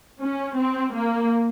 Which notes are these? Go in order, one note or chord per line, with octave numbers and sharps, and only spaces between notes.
C#4
C4
A#3